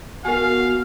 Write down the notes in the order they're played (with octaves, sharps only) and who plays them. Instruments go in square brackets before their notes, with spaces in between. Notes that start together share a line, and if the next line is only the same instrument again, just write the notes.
[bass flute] B3 [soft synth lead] F#4 [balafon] A#4 G#5 [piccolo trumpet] F5